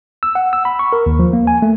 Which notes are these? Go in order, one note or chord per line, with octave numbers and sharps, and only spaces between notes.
E6
F#5
E6
B5
C#6
A#4
D#2
F3
A#3
G#5
A3